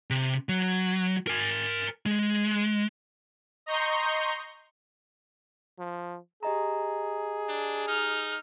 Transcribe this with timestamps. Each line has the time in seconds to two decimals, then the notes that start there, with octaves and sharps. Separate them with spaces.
0.10 C3
0.49 F#3
1.27 A#4 G#5
2.06 G#3
3.66 D#5 A#5 C6 C#6 G6
5.79 F3
6.43 G4 G#4 D#5 A#5
7.49 D4
7.88 D#4 F6